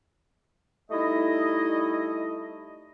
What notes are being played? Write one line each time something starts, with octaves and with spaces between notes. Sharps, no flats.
G3 A3 D#4 E4 D#5